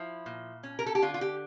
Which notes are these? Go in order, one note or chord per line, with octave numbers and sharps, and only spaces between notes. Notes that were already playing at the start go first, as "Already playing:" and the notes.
Already playing: F3 E4
A#2
C#4
A#4
A4
G4
D3 F4
F4
G4